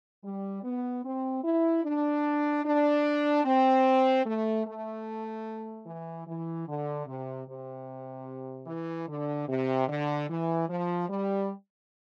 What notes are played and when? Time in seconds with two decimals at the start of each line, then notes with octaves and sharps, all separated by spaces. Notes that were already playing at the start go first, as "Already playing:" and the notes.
0.23 G3
0.62 B3
1.04 C4
1.43 E4
1.84 D4
2.64 D4
3.44 C4
4.25 A3
4.65 A3
5.85 E3
6.26 E3
6.67 D3
7.06 C3
7.47 C3
8.66 E3
9.07 D3
9.48 C3
9.88 D3
10.28 E3
10.68 F3
11.08 G3